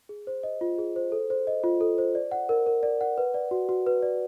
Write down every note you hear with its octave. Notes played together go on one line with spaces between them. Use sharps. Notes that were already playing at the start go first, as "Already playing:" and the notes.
G#4
C5
D#5
F4
G#4
C5
A4
C5
D#5
F4
A4
C5
D5
F#5
A#4
A#4
D5
F#5
B4
D5
F#4
F#4
B4
D5